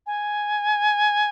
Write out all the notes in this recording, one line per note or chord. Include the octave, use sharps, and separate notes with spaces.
G#5